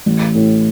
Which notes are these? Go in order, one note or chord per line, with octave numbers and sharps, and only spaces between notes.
A1
A2